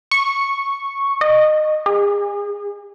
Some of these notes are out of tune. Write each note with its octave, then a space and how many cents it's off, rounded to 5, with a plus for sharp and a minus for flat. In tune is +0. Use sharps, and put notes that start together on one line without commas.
C#6 -5
D#5 -20
G#4 -35